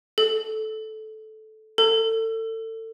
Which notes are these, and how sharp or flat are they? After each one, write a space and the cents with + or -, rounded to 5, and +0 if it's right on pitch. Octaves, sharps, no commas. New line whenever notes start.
A4 -15
A4 +30